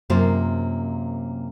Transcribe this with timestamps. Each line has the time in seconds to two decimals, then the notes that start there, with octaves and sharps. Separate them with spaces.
0.10 F#2 C3 A#3 F4 C5